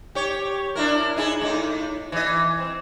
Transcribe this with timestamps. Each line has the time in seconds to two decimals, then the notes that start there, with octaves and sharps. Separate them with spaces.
0.15 G4 C#5
0.76 D4 E4 A#4
1.17 D#4 E4 G#4
1.41 A2 D#4
2.12 E3 D#5
2.59 C4